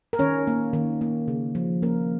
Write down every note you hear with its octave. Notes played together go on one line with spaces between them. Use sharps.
A#4
D#3 C#4 C#5
A#3
D#3
A#3
C#3
F3
A#3 C#4 A#4